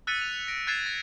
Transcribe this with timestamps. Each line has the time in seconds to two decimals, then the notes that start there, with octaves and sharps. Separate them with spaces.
0.07 E6 F#6 A6 B6 C#7 D#7
0.22 F7
0.48 A#6 D7
0.67 F#6 G#6 A6 C7 D#7 E7
0.86 A#6